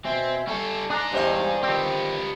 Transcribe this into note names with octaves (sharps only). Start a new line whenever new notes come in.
B2 C4 E5 G#5
G3 A4 G#5 C#6
D4 G#4 A#5 F#6
E2 G2 G4 C5 D#5 G#5
D#3 F3 B3 C4 G4